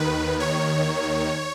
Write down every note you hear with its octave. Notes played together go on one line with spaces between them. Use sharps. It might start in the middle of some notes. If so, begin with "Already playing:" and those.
Already playing: D#2 D#3 B4
C#5